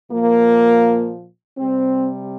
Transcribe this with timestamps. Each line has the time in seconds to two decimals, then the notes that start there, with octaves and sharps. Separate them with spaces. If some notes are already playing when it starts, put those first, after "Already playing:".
0.11 A#2 F3 A#3
1.58 C3 G3 C4